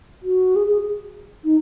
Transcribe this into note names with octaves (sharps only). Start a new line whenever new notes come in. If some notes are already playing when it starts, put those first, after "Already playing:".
F#4
G#4
G#4
D#4